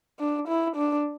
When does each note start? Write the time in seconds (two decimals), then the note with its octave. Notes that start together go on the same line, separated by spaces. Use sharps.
0.19 D4
0.48 E4
0.76 D4